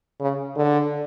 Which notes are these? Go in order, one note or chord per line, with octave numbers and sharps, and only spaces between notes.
C#3
D3